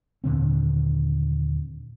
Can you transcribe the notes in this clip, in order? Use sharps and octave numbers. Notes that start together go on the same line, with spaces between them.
D#2 A#2 D3 C4